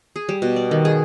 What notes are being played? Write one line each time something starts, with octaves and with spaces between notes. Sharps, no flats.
G#4
G3
B2
D5
D#3
G#4